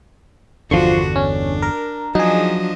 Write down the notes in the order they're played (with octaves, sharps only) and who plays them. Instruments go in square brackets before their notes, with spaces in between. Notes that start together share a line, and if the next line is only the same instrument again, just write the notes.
[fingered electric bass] G1 E2 D3 [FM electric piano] F3 C6 C#6 [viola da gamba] D4 F#4
[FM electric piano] C#4 [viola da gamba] D4
[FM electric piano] A#4
[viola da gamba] F3 D4 D#5 [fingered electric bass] F#3 [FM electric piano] D#4 G#4